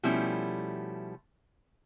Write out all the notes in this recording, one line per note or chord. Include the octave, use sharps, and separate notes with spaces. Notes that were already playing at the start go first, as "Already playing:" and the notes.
B2 F3 G3 A3 C#4 E4